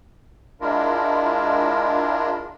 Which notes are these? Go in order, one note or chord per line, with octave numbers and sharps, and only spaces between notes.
G#3 D4 E4 F4 A#4